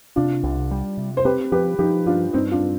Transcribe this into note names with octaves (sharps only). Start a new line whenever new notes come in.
C3 D4 F4
C2
G3
C3
C5
C4 G4 B4
F3 G4 B4
F3 D#4 G4
G2 D4 F4
G2 C4 D#4
D4 F4